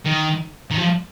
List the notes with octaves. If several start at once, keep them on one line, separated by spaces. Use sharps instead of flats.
D#3
D#3
F3